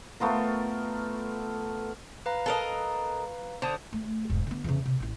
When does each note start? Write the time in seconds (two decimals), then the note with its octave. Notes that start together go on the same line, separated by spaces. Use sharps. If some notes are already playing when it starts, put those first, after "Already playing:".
0.20 A3 B3 F4 A#4
2.26 B4 F5 A#5
2.46 A4 A#4 D#5
3.62 D3 C5 A5 D#6
3.93 A3
4.30 E1 G#2
4.47 D3 B3
4.64 E2 C#3
4.86 C3
5.00 A1 E4